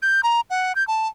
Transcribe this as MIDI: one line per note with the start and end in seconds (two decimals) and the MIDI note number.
0.02 0.21 91
0.23 0.41 82
0.50 0.75 78
0.75 0.86 91
0.88 1.07 81